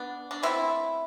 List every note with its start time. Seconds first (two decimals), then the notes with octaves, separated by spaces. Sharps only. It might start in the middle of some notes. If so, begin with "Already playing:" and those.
Already playing: B3 D4
0.31 D4
0.43 B2 A3 C4 E4